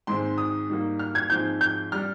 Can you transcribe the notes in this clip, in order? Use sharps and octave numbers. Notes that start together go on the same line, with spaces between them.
G#2 D#3 G#3 C4 C6
D#6
G#2 G3 A#3
F6
G#6
G#2 F3 G#3 C4 G6
G6
G3 D4 F6